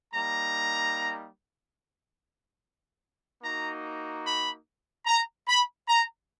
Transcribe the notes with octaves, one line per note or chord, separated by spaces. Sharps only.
G3 A#3 D#4 A#5
A#3 D#4 F#4 A#5
B5
A#5
B5
A#5